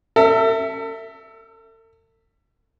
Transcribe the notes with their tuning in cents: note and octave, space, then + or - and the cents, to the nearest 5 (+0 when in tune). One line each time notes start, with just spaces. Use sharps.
A4 +40 E5 +0